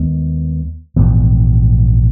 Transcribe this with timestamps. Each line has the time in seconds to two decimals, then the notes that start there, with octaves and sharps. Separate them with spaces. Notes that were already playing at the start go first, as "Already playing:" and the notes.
Already playing: D#2 D#3 G#3 B3
0.96 A#1 G#2 E3 B3